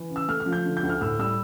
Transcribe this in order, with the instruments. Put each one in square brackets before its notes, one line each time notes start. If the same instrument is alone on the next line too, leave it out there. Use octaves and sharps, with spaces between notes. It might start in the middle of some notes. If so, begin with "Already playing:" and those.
Already playing: [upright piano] E3
C#3
E6
A3 F6
F6
F3
G6
D3
G6
D2
F6
A2 E6
G3 E6